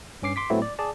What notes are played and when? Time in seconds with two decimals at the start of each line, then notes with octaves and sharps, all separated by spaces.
0.22 G2 C#4 D6 C7
0.36 C6 D6 B6
0.50 A2 F#3 A3 B3 C4 E4
0.62 D5
0.79 G#4 D5 A5